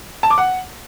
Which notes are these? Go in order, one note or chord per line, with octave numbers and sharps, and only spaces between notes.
A5
D6
F#5